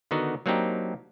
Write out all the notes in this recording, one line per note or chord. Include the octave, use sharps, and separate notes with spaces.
D3 D#3 B3 D#4 F#4
F#3 A#3 C4 D4 D#4 G4